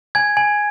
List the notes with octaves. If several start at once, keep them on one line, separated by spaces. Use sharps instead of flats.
G#5 G#6
G#5